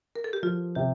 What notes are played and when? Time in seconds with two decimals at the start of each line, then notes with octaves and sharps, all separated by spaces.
0.16 A#4
0.24 A4
0.33 G4
0.43 F3 F4
0.75 C3 G4